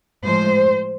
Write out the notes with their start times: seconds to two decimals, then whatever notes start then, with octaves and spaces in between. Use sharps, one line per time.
0.24 A2 F3 G#3 C5